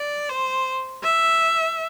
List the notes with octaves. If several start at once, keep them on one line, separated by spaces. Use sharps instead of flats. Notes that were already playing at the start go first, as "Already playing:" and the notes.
Already playing: D5
C5
E5